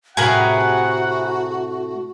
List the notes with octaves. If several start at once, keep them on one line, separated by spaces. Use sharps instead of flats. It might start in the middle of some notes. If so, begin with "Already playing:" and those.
A2 C3 F#4 G#4 A#4 B4 F#5